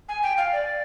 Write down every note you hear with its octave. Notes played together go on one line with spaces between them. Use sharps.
G#5
G5
F5
D5